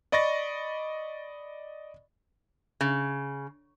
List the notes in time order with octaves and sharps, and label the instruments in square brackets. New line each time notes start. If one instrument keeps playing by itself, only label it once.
[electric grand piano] D5 D#5 B5 C#6 A6 A#6
[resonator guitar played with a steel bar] C#3